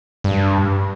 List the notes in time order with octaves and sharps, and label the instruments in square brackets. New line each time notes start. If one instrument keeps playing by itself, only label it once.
[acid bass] G2